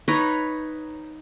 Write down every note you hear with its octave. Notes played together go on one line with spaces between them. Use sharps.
D#4 B4 C#5 A#5